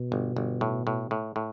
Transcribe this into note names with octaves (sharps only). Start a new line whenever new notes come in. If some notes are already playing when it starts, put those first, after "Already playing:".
Already playing: B2
G1
G1
A2
A2
A2
A2